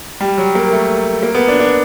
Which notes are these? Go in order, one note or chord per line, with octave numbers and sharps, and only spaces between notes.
G3
F#3
A#3
A3
A#3
B3
D4
D4